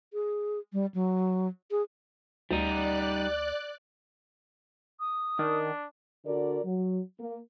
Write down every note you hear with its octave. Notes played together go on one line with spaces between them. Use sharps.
G#4
G3
F#3
G#4
D2 G3 D#4 D5 F#6
D#6
D#3 D4
D3 F#4 A#4 D5
F#3
A#3